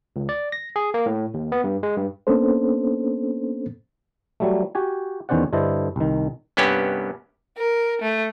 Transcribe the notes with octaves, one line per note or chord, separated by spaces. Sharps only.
C#2
D5
A#6
G#4
A#3
A2
D#2
B3
G2
G#3
G2
A#3 B3 C#4 D4 A4 C5
F#3 G3 A3
F#4 G4 G#5
E2 D#3 C#4 C5 D5 F#5
G2 D3 E4 A4 C5 D#5
C2 D#3
C2 G2 B3 C#4 G4
A#4
A3